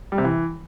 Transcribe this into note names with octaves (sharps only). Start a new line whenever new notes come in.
G3
C3
E3